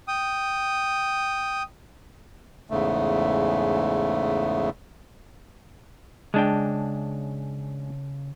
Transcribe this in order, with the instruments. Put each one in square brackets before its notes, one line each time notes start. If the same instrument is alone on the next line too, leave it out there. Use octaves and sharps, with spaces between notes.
[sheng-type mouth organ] G5 D#6
[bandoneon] E2 G#2 C#3 A3
[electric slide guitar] C#3 A5 [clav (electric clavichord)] G#3 D4 G5